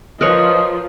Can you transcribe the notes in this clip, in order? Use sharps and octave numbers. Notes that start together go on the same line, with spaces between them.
F3 A#4 B4 C#5 D#5